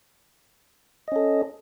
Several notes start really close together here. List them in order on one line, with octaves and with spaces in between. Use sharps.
D#5 C#4 A4